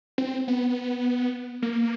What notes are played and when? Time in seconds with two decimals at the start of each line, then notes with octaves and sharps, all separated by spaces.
0.18 C4
0.48 B3
1.62 A#3